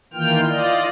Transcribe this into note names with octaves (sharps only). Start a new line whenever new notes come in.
D#3 E3 A#3 F4 G5 F6
F4 D5 D#5